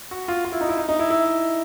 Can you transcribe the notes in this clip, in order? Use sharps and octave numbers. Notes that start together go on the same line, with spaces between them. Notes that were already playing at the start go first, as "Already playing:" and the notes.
F#4
F4
F4
E4
D#4
E4
D#4
D#4
E4
E4